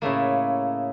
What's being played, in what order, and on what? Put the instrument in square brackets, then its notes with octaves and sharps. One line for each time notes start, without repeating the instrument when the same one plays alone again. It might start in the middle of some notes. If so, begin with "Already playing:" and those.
[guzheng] A2 C#3 A3 A#3